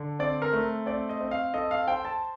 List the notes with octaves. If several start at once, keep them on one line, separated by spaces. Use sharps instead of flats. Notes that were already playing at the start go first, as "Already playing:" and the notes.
Already playing: D3
C4 D5
A#4
A3
C4 D5
D#5
C4
F5
A4 D#5
F5
C5 G5
A5